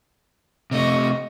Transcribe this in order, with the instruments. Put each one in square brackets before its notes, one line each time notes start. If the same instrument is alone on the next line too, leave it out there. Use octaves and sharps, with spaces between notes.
[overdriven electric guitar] C3 A3 [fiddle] D#5 C#6